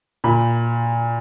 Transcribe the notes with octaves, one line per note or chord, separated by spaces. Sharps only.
A#2 B5